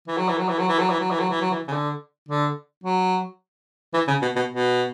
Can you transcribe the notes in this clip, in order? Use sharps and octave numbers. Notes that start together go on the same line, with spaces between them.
E3
F#3
E3
F#3
E3
F#3
E3
F#3
E3
F#3
E3
F#3
E3
F#3
E3
C#3
D3
D3
F#3
E3
C#3
B2
B2
B2